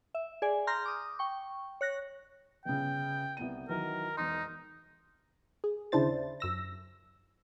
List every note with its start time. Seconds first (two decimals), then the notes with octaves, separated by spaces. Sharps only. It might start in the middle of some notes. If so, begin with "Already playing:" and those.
0.15 E5
0.42 G#4 D5 G#5
0.67 A#5 C6 F6 G6 A#6
0.85 D6 D#6
1.19 G5 C#6
1.81 C#5 F#6 A#6
2.65 G1 C#3 G5
3.37 C2 B3 D#7
3.69 D#3 E3 F#3 A#4
4.17 E1 D#4 C6
5.64 G#4
5.92 D#2 C#3 D4 E4 C5 A6
6.40 F#2 E6 A#6